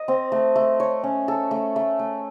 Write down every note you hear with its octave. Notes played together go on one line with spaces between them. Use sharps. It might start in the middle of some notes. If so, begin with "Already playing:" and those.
Already playing: D#5
C4
A3
A3
C#5
C#4
A4
A3
A3
A3